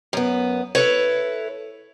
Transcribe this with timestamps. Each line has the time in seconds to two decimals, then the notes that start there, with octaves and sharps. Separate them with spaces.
0.13 F#2 B3
0.75 E4 A4 B4 C#5